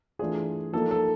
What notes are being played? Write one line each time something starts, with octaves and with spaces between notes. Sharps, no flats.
E3 A3 D4 F4 G#4
F3 A#3 D#4 A4
A4